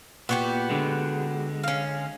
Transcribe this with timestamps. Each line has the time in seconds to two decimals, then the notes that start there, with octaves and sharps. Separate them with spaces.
0.29 A#2 B3 F#4 G4
0.70 D3 G#3
1.64 C#4 F5